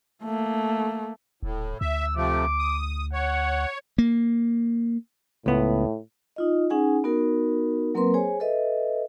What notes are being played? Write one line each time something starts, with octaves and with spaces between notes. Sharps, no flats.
A3 A#3
D#1 A2
D2 E5 E6
C3 F3 A3 D6
D#6
C#5 F#5
A#3
C#2 A2 B3
D#4 F4 D#5
C#4 D#4 G#4 F#5 G#5
B3 D#4 F#4 A#4
F#3 A#3 C4 A#4 B4 C6
G#4 C5 C#5 G#5
A4 B4 D#5 E5